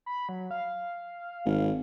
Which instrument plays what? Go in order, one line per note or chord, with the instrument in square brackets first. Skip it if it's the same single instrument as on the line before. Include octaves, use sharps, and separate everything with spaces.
[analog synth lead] B5
F#3
F5
[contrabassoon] G#1